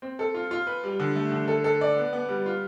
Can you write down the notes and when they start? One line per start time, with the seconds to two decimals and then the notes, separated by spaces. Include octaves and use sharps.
0.02 C4
0.19 A4
0.34 F4
0.51 F4
0.67 B4
0.84 G3
1.00 D3
1.16 A3
1.32 D3
1.48 A4
1.64 A4
1.81 D5
1.97 B3
2.13 B3
2.29 G3
2.46 F4